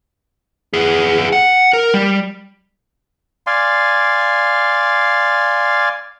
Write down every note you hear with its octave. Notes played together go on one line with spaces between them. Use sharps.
B3 G#4
F#5
A#4
G3
D5 F5 G#5 C6